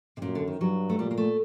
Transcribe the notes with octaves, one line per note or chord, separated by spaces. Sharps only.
C3
F#2 A#2
D3
D#3
G2 F#3
A3
A#2 G3
A#3
A3